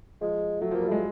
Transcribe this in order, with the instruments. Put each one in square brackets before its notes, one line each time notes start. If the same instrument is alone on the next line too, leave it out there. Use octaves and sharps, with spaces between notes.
[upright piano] F3 [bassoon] G#3
[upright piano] F#3 [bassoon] A3
[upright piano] F3
[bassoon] A#3
[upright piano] G3
[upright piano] G#3 [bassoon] A3